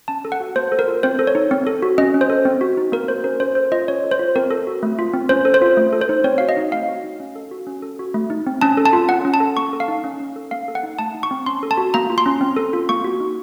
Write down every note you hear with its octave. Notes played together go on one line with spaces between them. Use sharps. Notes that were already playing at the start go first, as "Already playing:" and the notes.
C#4 A5
A4
F#5
F#4
A#3 C5
A4
A#4
F4
C4 C5
A4
C#5
D#4
C4
A4
F#4
C#4 D#5
C#4
C5
A4
C4
F#4
D#4
A#3 A#4
F#4 C5
C#4 A#4
C#4 C5
A4 C5
F4 D#5
C#4 C#5
A4
C5
F4
C4 A#4
A4
F#4
A3
F4
C4
C#4 C5
A4
C5
F4
A3
A4
C5
D#4
C4 C#5
F#4 F5
D#5
D#4
A3 F5
F#4
D#4
C#4
A4
F#4
C#4
A4
F#4
A3
D#4
C4
C#4 A5
A4
A5
F4
C#4 F#5
C#4
A5
A4
A#3 C#6
A4
F5
D#4
C#4
C#4
A4
A#3 F5
A4
F#5
D#4
A3 A5
D#4
C#6
C4
C#4 C6
A4
A5
F#4
A#3 A#5
F4
C6
C#4
C4
A4
F4
A#3 C#6
F#4
D#4